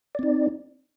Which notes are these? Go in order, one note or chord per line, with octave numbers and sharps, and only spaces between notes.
C4 D#4 D5